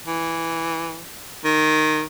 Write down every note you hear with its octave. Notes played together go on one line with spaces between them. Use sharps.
E3
D#3